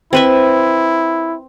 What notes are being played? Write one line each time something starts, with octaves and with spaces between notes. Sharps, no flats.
C4 E4 B4 E5